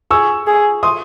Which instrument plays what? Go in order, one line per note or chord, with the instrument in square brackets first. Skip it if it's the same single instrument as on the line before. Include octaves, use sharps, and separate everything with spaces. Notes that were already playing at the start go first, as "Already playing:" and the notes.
[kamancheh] G#4 [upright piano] C#6 E6
[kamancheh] G#4
[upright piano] C6 D#6